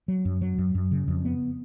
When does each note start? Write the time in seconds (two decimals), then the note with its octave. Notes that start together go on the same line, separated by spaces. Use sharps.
0.08 F#3
0.25 F#2
0.42 F#3
0.58 F#2
0.75 F#2
0.91 C#3
1.08 F2
1.25 B3